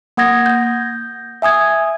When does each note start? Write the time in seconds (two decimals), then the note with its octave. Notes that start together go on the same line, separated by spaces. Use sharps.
0.17 A#3 F#5 D#6 G#6 A#6
0.46 G6 A#6
1.42 E5 G#5 D#6 G#6